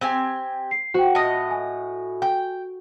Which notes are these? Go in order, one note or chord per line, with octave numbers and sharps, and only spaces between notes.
C4 G4 G#5
C7
F#4 C5 F#5 G5
A2 D#5 A5 A#6
G#5
G5